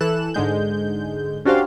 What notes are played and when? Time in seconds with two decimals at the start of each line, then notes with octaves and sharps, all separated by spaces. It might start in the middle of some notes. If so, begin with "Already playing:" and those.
0.01 E3 A4 F#6 E7
0.34 G#2 D3 G#3 G6
1.45 C#4 D4 F#4 G4 C5 F5